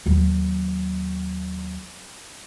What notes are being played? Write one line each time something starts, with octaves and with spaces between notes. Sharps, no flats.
D#2 F#3